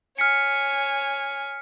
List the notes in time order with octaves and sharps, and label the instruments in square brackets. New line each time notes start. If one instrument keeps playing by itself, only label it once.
[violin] C#5 G#5 [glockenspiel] F6 B6 C#7